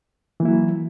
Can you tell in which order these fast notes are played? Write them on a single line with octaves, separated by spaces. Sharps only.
E3 A#3 E4 F#3